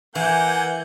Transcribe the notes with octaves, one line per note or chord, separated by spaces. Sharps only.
E3 A#3 F#5 G#5 G6